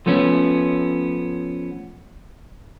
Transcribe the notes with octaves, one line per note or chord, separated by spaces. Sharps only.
F3 A3 B3 C#4